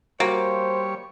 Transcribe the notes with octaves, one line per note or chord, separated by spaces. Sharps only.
G3 A#3 F#4 C5 C#5 G5